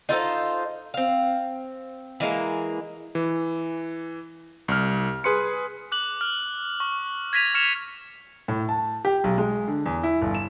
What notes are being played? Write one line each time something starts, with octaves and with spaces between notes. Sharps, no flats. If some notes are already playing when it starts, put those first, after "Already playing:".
D#4 F4 A4 C5
C4 F5
E3 G#3 A#3
E3
C2 F6
G#4 B4 C6 C#7
D6 F#6 F#7
F6
C#6
G#6 A#6 B6 D#7 F7
C#6 F6 G#6 C#7 E7 F7
A2
A5
G4
B1
G#3
D3
E2
E4
G1
E7